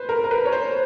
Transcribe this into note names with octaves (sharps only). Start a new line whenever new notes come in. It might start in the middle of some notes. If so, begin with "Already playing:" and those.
Already playing: B4 C5
A#4
A#4
B4
C#5
C5